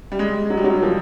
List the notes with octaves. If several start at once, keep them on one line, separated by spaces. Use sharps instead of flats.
G3
G#3
F#3
G3
F#3
G3
F3